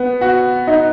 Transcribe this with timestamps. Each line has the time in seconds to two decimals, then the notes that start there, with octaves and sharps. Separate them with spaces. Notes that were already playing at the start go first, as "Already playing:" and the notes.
Already playing: B3
0.21 F#4
0.67 D#4